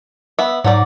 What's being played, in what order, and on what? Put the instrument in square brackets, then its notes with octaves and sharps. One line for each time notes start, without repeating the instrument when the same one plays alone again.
[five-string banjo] B3 E5
[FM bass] G#2 [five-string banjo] F#3 F#4 D5